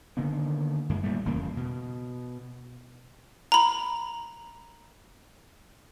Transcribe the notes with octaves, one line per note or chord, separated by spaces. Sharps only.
D3 D#3 A#3 B3
F#2 D#3 G#3 A#3
A#2 G3 A3
D#1 E2 C#3 A#3
B2
A#5 B5